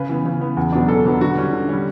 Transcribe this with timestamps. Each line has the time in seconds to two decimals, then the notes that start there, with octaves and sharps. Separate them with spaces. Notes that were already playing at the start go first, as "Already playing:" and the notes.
Already playing: C#3 B4
0.09 E3 B3
0.25 C#3
0.40 E3 B3
0.57 E2
0.72 B2 F#3 B3 D4
0.88 E2 A4
1.05 B2 F#3 B3 D4
1.21 D3 F#4
1.37 G3 C#4
1.53 D3
1.69 G3 C#4